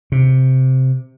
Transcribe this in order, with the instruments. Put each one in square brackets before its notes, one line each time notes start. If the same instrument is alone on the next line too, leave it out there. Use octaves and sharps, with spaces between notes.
[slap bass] C3